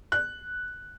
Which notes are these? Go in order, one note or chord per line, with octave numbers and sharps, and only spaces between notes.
F#6